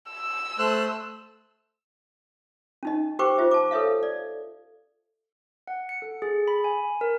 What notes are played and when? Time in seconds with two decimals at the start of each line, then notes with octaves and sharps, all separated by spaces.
0.11 E6
0.58 A3 C5 F#6
2.83 C#4 D#4 D#5
3.19 G4 B4 C5 G5 C#6 D6
3.38 F4 C5 E5
3.51 A5 D6
3.71 A4 B4 C#5 E5 F5
4.03 D5
5.68 F#5
5.89 C#7
6.02 A4
6.22 G#4
6.48 B5
6.64 G#5
7.01 A#4